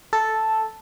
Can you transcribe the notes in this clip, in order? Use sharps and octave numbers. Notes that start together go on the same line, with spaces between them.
A4